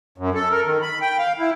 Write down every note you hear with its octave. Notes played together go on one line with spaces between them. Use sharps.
F#2
A4
A#4
D#3
B5
G5
F5
E4